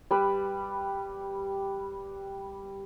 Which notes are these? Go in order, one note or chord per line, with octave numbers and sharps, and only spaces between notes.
G3 B4